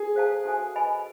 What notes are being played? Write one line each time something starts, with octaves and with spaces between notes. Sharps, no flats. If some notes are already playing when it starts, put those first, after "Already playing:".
Already playing: G#4
A4 C5 F5 A5
F#4 A4 C5 E5 G#5
B4 D#5 G#5 B5